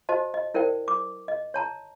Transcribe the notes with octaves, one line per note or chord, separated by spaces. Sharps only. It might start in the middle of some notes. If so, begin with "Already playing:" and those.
F#4 C5 D#5 A5
D#5
E4 A#4 C5 D5 G5
D6
D#5
C#5 A5 A#5